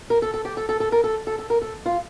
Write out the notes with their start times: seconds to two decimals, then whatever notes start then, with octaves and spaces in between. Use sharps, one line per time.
0.10 A#4
0.22 A4
0.34 A4
0.45 G4
0.57 A4
0.69 A4
0.80 A4
0.92 A#4
1.04 A4
1.27 A4
1.39 A4
1.50 A#4
1.62 A4
1.86 F4